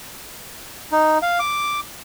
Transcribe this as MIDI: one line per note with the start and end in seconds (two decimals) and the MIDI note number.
0.92 1.18 63
1.22 1.39 77
1.39 1.80 86